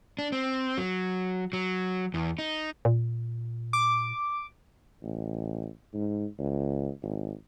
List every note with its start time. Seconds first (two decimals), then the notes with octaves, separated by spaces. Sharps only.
0.19 D4
0.32 C4
0.77 F#3
1.53 F#3
2.14 E2
2.39 D#4
2.85 A#2
3.73 D6
5.03 A1
5.93 G#2
6.38 C#2
7.02 G#1